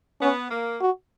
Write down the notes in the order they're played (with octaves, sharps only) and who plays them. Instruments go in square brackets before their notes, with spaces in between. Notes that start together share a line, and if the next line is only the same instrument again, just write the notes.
[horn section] B3 [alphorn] C#4
[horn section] A#3
[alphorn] F#4